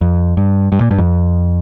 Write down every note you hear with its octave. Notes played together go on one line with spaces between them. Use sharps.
F2
G2
G2
A#2
G2
F2